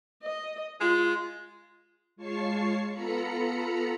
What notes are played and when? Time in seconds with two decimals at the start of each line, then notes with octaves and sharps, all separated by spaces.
0.23 D#5
0.81 G#3 F4
2.16 G#3 F4 C#5 A5 C#6 C7
2.91 B3 F4 A4 A#5 B5 C#7